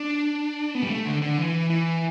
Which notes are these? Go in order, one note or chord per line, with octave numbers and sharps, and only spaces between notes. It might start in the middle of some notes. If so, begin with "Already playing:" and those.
Already playing: D4
B3
G3
A3
D3
D3
E3
E3